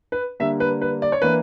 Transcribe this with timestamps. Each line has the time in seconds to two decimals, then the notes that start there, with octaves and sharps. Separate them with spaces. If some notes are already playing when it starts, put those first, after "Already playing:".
0.12 B4
0.40 D3 G3 A#3 D4 E5
0.60 B4
0.81 B4
1.02 D5
1.12 C#5
1.22 E3 A#3 D4 B4